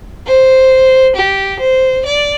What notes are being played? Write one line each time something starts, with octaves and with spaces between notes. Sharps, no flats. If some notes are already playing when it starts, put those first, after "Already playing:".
C5
G4
C5
D5